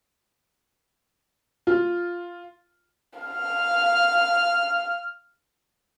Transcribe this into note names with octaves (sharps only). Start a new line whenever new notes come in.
F4
F5 F6